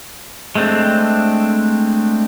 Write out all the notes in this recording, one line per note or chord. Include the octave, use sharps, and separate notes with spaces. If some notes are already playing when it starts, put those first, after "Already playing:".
G#3 A3 C4 D4